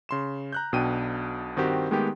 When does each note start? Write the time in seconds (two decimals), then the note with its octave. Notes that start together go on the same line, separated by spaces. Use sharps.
0.09 C#3 C6 E7
0.52 A#5 F#6 G6
0.72 B1 B2 D4 G5 D#7
1.56 G2 D#3 C4 F#4 G4
1.91 D#3 G#3 A3 B3 D#4 G4